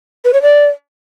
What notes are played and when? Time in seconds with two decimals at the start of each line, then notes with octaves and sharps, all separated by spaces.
0.25 B4
0.33 C#5
0.42 D5